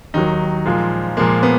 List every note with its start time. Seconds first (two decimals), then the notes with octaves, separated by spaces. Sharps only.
0.14 D#2 D#3 F#3 D#4
0.66 A#2 F3 G#3
1.17 A#2 F3 G#3 A#3
1.43 B3